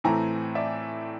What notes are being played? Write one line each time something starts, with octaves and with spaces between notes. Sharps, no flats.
A2 E3 A3 C4 G#5 A#5
D5 E5